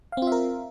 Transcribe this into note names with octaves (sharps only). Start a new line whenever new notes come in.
C4 F4 A#4 E5 F5